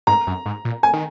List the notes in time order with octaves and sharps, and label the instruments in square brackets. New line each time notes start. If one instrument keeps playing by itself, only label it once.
[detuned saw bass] G#2 [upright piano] A#5
[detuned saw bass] F#2
G#2
A#2
[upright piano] G#5
[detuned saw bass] D#3